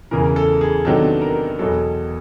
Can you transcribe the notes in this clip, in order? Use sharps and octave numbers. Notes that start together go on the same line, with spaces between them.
E2 C#3 E3 A#4
A4
G#4
C3 D#3 F#3 B3 D4 A4
A#4
E2 B2 F#3 A4